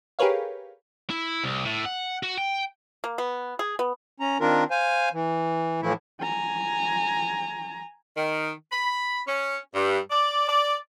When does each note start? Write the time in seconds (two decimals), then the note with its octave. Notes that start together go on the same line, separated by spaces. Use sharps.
0.19 G4 G#4 A#4 B4 C#5 F5
1.10 E4
1.44 C2
1.65 A2
1.85 F#5
2.23 F#4
2.38 G5
3.04 A#3
3.18 B3
3.59 G#4
3.79 B3
4.20 C#4 A#5
4.41 D#3 C4 D4 F4 A#4
4.71 C5 F5 G#5
5.13 E3
5.82 A2 E3 F3 A3 E4
6.21 G#5 A#5
8.16 D#3
8.71 B5
9.28 C#4
9.74 G2
10.11 D5
10.49 D5